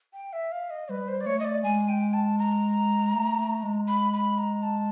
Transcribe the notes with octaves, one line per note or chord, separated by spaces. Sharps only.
G5
E5
F5
D#5
G3 B4
C5
D5
A3 C#5
D#5
D5
G#3 G#5
G5
A5
A#5
A3
A3
G#3
B5
B5
A#5
A5